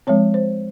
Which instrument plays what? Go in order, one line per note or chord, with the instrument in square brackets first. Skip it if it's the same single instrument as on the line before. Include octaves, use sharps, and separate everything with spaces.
[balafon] F3 G#3 C4 C#5
C5